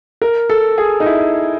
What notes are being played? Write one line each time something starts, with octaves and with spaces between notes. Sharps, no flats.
A#4
A4
G#4
D#4
E4